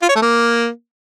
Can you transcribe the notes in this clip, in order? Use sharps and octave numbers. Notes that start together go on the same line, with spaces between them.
F4
C#5
A3
A#3